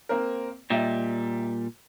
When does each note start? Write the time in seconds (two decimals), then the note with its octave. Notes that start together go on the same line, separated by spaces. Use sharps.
0.09 A#3 C4 A#4
0.70 A#2 G3 D#5 E5 G5